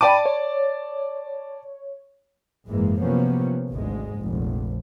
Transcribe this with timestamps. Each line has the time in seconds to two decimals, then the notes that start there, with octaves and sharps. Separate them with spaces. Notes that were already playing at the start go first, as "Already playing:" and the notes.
0.01 D5 G5 A5 B5 D6 D#7
0.26 C#5
2.67 F#1 G#2 E3 G#3 A#3
3.01 C3 F3 F#3 A#3 B3 C#4
3.70 G#1 D2 G#2 G#3
4.14 F1 A#1